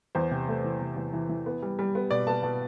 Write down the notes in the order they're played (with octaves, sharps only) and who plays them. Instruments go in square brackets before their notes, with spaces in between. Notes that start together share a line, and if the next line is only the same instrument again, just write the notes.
[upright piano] E2 C5
C3
A3
E3
C3
E2
E3
E3
B3
G3
G3
B3
B2 D5
B3 A5
B2 A5